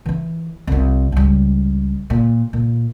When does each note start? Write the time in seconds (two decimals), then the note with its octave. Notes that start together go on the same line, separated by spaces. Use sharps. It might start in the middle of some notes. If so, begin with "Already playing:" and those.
0.06 E3 E4
0.67 C2 F4
1.12 C#2 G3
2.10 A#2
2.53 A#2